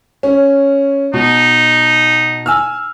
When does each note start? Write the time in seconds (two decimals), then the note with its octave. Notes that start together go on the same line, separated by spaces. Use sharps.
0.23 C#4
1.13 B2 D#4
2.46 G#5 E6 F6